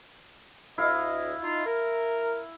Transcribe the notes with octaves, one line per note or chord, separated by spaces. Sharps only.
D2 E4 D#5 F5
D#4 F4
A#4